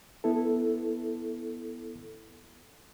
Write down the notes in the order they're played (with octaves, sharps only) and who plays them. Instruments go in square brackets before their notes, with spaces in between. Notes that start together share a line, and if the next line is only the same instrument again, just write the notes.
[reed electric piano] B3 E4 A4